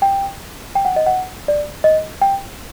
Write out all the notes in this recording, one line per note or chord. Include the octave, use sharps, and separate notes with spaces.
G5
G5
F#5
D#5
F#5
D5
D#5
G5